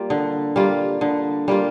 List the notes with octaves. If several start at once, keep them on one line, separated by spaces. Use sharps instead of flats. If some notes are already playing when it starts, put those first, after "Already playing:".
Already playing: G3 A#3 F4
D3
G3 A#3 F4
D3
G3 A#3 F4